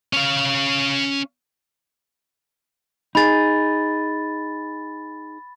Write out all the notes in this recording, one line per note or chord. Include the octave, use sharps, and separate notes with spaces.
C#4 F5
D#4 G#4 B5 A6